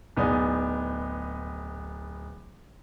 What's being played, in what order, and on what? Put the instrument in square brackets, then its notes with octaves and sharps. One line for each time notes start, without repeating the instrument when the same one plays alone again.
[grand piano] D1 B3 D#4 D5 G#5